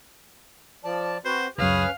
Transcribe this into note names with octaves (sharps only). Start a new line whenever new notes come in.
F3 D5 A5
C4 F#4 B4 C5
C#2 F#2 C#4 G#4 B4 F5